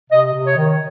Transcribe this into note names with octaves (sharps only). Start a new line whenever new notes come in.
C3 D#5
C3
C#5
D#3